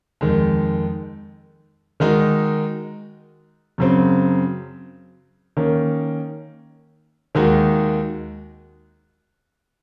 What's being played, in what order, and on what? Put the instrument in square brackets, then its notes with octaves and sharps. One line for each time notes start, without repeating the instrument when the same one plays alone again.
[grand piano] F2 D#3 G#3
D#3 G#3 D#4 F#4
F#2 C#3 F#3 C4
D#3 A#3 C#4
D#2 D#3 G#3 D#4 F#4